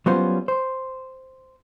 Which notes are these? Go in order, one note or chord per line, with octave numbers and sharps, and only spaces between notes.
F#3 G3 B3 C#4 F4 C5
C5